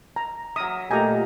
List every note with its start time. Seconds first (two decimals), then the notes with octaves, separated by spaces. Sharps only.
0.16 A#5
0.56 F#3 A#4 E5 D#6
0.91 A#2 A3 A#3 D#4 G4 G#5 A#5